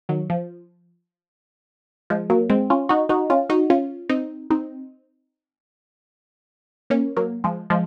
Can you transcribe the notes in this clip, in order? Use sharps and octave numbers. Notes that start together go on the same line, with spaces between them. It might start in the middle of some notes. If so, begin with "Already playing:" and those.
D#3 F#3
F3
F3 G#3
F#3 A#3
G#3 C4
C#4 F4
D#4 F#4
D#4 F#4
C#4 F4
D#4 F#4
C#4 F4
C4 D#4
C4 D#4
A#3 C#4
F#3 A#3
F3 G#3
F3 G#3